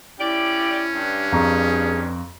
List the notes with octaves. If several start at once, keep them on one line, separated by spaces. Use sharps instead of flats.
C#4 E4 G4 D5
G2
F2 G#4 A#5 C#6